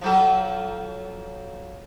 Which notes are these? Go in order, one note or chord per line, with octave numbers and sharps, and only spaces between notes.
F3 F#3 A4